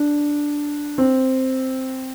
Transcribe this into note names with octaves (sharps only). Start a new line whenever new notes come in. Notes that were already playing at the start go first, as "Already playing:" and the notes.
Already playing: D4
C4